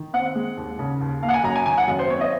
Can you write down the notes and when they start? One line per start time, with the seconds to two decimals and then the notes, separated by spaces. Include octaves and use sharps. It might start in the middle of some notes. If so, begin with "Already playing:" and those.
Already playing: D#3
0.13 C4 F#5
0.35 G#3
0.57 D#2
0.79 C#3
1.01 D#2
1.22 A#3 F5
1.29 F#5
1.34 G#5
1.44 F#2 A#5
1.56 G#5
1.66 D#3 G#5
1.77 F#5
1.88 F#2
1.99 C5
2.10 C4 C#5
2.21 D#5